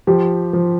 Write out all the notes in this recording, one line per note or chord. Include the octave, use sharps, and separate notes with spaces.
F3 G4
F3